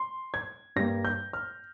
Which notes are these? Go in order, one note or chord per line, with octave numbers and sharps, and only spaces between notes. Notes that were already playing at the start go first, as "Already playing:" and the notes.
Already playing: C6
G#6
G2 G3 A#3 A#6
G6
F6